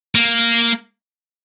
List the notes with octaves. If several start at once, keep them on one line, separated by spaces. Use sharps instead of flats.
A#3